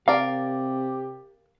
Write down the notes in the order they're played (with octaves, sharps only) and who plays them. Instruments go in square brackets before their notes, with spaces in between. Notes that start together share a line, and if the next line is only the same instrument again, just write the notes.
[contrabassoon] C3 [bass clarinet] G4 [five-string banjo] A#4 D5 [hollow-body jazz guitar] F5